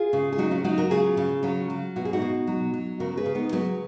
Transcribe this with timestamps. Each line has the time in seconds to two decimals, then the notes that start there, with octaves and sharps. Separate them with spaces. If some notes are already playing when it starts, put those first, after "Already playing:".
Already playing: F4 G#4
0.13 C#3
0.32 G#4
0.38 F#3 D#4 F#4
0.51 C#4 F4
0.64 F#3 D#4 F#4
0.78 F#4 A#4
0.91 C#3 F4 G#4
1.17 C#3
1.43 F#3 C#4 F4
1.70 F#3
1.96 B2 F#4
2.05 G#4
2.13 D#4 F#4
2.22 B2
2.47 F#3
2.74 F#3
3.00 C#3 F#4 A#4
3.17 G#4 B4
3.26 C#3
3.35 B3 D#4
3.52 F#3 G#4 B4